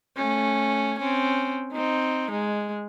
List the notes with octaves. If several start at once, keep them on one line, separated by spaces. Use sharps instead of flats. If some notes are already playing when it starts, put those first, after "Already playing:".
A3 C#4
C4 C#4
C4 D#4
G#3